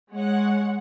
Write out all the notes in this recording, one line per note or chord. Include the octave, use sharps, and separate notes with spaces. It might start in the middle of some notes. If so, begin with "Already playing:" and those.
G#3 C#5 F#5